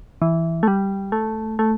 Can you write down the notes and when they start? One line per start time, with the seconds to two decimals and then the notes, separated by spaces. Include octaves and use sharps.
0.22 E3
0.63 A3
0.68 G3
1.12 A3
1.59 A3